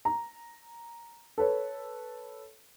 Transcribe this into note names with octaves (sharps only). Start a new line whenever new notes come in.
A#5
A4 B4 C#5